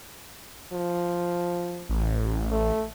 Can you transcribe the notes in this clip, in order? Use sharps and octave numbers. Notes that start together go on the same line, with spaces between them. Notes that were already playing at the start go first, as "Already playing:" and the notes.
F3
A1
A3